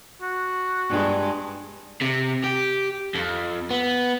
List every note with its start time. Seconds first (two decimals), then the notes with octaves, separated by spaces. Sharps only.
0.22 F#4
0.89 G2 G#3
2.02 C3
2.44 G4
3.15 F2
3.71 B3